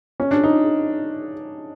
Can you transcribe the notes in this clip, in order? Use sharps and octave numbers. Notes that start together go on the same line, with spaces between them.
C#4
D4
D#4